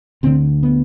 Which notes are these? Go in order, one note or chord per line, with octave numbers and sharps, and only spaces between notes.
D2 D3 C4
B3